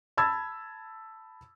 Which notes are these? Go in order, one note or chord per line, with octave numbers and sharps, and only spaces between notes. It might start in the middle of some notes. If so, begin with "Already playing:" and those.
A5 B5 E6 G#6 A6